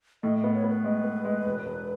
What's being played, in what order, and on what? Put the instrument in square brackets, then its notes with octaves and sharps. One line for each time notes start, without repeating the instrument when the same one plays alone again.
[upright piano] A2 [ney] D#5
[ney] D#5
[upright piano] B3
[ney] C#5
[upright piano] B3
[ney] B4
[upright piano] G#3
B3
G#3
E1
E1